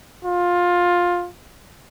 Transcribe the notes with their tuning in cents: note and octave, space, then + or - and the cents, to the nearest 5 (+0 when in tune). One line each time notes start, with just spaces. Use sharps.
F4 +15